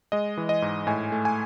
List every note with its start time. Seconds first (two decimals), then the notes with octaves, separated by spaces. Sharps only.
0.12 G#3 D#5
0.37 E3
0.49 D#5
0.62 G#2
0.87 A2 G#5
1.12 A3
1.25 G#5